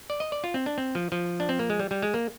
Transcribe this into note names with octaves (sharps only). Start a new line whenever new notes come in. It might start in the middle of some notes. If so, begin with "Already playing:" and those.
D5
D#5
D5
F4
C4
D4
C4
F3
F3
D4
C4
A#3
G#3
G3
G3
G#3
A#3